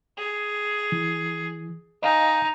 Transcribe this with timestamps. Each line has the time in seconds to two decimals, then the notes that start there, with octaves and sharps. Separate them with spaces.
0.18 G#4
0.92 E3
2.02 D#4 D#5 F5 G#5